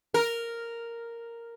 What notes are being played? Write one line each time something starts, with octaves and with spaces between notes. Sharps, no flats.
A#4